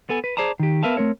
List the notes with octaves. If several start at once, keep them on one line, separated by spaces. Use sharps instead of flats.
B3 A4 G#5
B4
G#4 C5 D5 A5 A#5
D#3 G4
B3 A#4 B4 E5 F5 A5
A3 C4 A#4 C#5